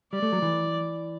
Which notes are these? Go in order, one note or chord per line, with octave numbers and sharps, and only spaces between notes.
G3 D5
A3
F#3
E3